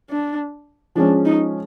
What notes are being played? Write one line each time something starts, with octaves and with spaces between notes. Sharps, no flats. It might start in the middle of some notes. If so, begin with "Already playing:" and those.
D4
F3 G#3 C#4 D4
D#4